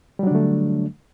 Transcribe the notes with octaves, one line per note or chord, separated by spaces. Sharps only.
D3 F#3 G3 A3 D4